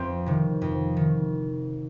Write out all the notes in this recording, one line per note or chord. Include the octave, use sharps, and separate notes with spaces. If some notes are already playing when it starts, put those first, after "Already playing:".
Already playing: F2 C4
C3 D#3
F2
D#3